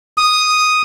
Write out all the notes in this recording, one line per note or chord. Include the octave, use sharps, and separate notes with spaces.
D#6